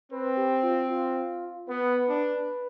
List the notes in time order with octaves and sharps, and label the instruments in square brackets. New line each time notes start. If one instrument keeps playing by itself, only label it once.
[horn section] C4 [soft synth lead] B4
[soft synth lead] G4
F4
F4
[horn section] B3 [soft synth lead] B4
[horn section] D4